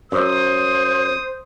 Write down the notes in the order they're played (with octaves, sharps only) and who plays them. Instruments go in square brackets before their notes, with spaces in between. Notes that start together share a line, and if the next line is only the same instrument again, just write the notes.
[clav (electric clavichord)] F#2 [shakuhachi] C5 [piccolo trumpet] D#6